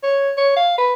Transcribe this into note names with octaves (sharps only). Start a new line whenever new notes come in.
C#5
C#5
F5
B4